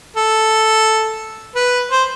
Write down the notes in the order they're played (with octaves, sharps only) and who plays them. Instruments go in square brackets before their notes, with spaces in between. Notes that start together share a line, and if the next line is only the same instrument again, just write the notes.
[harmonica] A4
B4
C5